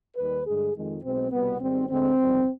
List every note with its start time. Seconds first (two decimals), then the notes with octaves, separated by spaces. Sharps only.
0.16 D#2 D#3 G3 B4
0.45 G2 D3 G#3 G#4
0.74 F2 D#3 G#3
1.02 B1 B2 G#3 C4
1.31 C2 B2 G3 B3
1.60 G#1 G#2 G3 C4
1.88 D2 D3 G#3 C4
2.18 G1 F2 D#3 G3